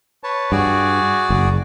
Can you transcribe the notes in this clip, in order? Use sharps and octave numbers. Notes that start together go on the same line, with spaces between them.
B4 C#5 A5
G2 F#4 G#4 D5
F#1